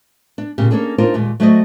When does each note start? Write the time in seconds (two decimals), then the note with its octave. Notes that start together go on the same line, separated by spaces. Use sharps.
0.38 D4
0.58 A#2 C#3 G4
0.71 A#3 C#4 D4 G#4 A4
0.98 D4 D#4 F4 A#4 C5
1.14 D#2 A#2 G#3
1.40 F#3 A3 F#4 C5 D5 D#5